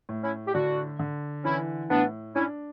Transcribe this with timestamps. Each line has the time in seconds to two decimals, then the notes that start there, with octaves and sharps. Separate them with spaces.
0.09 A2
0.23 C#4 E4
0.48 G4
0.54 D3 D4 F#4
0.99 D3
1.44 E3 C#4 E4
1.90 A2 B3 D4
2.35 C#4 D4 E4